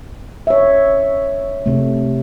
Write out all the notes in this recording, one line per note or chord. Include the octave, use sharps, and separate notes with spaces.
C#5 E5
C3 A3